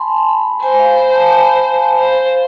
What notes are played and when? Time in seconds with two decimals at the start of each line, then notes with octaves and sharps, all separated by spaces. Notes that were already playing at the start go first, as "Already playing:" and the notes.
Already playing: G#5 A5 B5 C6
0.17 C6
0.29 B5
0.63 C5 G#5
0.79 F5
0.96 B5
1.13 A5
1.30 G#5
1.98 C5 F5